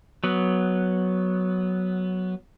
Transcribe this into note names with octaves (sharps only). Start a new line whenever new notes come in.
F#3 B3